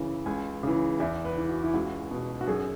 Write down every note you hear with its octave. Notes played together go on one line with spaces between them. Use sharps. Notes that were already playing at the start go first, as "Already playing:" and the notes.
Already playing: F#2 C#3 E3
C#2 G#5
C#3 E3
E2 E5
B4
E3
F#4
E4
C#2 F#4
B2
F#4
F#2 G#4